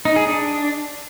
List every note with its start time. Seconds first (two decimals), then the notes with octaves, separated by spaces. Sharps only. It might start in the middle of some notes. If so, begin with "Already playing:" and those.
0.05 D#4
0.16 G#4
0.27 D4